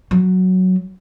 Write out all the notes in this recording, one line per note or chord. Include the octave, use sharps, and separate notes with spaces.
F#3